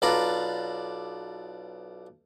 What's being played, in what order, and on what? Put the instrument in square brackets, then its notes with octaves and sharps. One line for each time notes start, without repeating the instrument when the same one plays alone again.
[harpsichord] B1 D4 F4 B4 D5 A#5